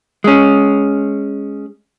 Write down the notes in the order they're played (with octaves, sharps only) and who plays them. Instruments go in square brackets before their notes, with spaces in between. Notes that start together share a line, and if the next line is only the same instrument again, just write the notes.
[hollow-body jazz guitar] G#3 C#4